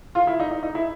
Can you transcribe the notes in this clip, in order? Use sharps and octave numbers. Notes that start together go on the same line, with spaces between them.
F4
E4
D#4
D#4
D#4
E4